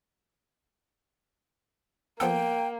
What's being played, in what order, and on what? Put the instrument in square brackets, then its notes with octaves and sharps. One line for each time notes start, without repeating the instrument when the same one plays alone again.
[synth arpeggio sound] F3 B3 A4 [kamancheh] A#3 [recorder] G5